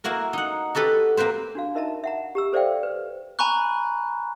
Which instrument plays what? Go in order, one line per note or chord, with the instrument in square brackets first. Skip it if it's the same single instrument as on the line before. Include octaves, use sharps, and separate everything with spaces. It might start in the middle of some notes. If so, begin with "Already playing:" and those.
[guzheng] A#3 E4 F#4 A#4
D#4 F#5
F#4 G4 A4 B4
A#3 C4 B4 C5
[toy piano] D4 F#4 F5
D#4 A#4 D#5 E5 A5 A#5
E5 F#5 A#5
G4 A#5 E6
A4 C5 D5 E5 F5 G5
B4 C5
[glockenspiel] G#5 A#5 B5 C#6 F#6